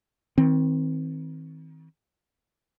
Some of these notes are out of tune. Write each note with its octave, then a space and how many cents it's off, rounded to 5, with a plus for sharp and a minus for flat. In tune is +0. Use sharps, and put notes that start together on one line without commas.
D#3 +35 C4 +0